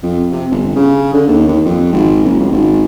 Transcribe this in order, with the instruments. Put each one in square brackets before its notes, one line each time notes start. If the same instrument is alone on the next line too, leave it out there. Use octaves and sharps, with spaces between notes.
[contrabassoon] F2
C3
G1
C#3
D3
D#2
D#2
F2
G#1
F#1
C#2
G#1